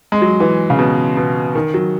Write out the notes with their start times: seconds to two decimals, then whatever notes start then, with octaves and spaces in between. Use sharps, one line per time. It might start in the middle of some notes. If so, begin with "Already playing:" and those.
0.12 G#3
0.22 F#3
0.40 E3
0.70 C#3
0.79 B2
1.17 B2
1.55 D#3
1.74 F#3